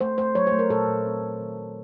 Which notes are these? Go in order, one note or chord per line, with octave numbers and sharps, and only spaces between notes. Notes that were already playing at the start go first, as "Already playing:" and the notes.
A3 C5
A3 C5
F#3 C#5
C5
A3
A#4
A#2 A4
A#2
C4
A#2
D#3
A3